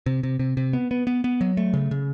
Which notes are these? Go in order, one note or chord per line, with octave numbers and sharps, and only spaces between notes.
C3
C3
C3
C3
B3
B3
B3
B3
F#3
A3
C#3
C#3